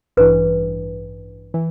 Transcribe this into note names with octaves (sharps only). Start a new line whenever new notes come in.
A1 G2 E3 B4
E3